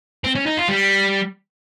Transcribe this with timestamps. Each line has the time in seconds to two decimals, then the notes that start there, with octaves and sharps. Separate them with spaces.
0.24 C4
0.35 C#4
0.46 D#4
0.57 F4
0.68 G3